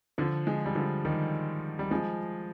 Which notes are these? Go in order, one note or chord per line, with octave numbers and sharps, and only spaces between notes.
D3 F3
F3 G#3
G3
D3 F3
D#3 G3
G3
F3 G#3